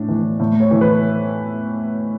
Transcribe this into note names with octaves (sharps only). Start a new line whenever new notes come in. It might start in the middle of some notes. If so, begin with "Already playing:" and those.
Already playing: A2 D4
E3
A2
C#5
E3
B4